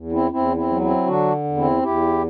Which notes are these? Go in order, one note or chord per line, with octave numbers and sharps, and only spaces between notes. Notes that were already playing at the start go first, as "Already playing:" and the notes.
Already playing: E2
C4 E4
E2 C4 E4
C4 E4
F#3
C4 E4
D3 D4 F#4
E2
C4 E4
E2 E4 G4